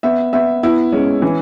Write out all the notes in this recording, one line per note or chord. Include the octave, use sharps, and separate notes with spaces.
B3 E5
B3 E5
B3 E4
G#3 C#4
E3